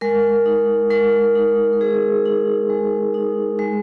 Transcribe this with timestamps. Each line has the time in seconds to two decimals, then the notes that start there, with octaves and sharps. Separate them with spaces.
0.01 G#3 A#4
0.46 D#4
0.90 G#3 A#4
1.35 D#4
1.73 A#4
1.81 G#3 G#4
2.26 D#4
2.69 G#3
3.14 D#4
3.59 G#3